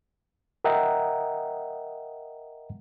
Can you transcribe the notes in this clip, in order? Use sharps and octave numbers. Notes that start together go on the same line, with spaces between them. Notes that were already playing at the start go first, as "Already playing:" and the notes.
A#4 D#5 E5 F#5 G5 A#5